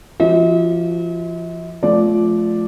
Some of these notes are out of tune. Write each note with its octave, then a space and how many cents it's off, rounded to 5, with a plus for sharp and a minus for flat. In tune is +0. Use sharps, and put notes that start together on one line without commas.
F3 -30 F#4 +0 E5 -45
F3 +0 A3 -30 D5 +0